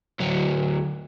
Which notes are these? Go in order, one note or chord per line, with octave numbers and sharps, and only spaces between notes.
D2 F#3